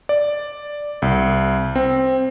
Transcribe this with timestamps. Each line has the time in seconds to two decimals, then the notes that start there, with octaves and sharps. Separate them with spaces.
0.09 D5
1.02 C2
1.75 C4